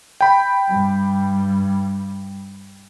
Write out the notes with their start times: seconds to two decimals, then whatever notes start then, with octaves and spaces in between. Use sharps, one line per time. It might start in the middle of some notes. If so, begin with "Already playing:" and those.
0.21 G5 B5
0.68 G2 G3